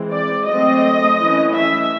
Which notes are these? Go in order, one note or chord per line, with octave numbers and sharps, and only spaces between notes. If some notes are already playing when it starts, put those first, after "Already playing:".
Already playing: E3 G#3 C4
D5
F#3 A3 C4 D#5
E3 A3 C#4
E5